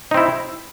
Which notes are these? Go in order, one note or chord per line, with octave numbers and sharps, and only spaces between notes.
C4 D#4 E4